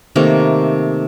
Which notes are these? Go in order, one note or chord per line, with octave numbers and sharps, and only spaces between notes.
C3 D#3 A3 A#3